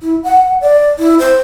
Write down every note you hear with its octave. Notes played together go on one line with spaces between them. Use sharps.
E4
F#5
D5
E4
C5